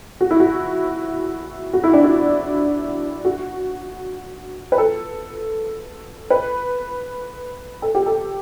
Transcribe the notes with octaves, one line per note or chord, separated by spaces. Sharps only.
F#4
E4
F#4
F#4
E4
D4
E4
F#4
B4
A4
B4
A4
G4
A4